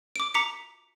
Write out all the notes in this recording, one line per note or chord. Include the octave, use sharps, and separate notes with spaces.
D6 D7
A#5 D6 B6 C#7